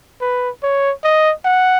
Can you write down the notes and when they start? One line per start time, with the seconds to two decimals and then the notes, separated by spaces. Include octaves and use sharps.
0.21 B4
0.63 C#5
1.04 D#5
1.45 F#5